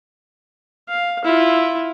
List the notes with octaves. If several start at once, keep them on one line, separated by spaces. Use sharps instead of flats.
F5
E4 F4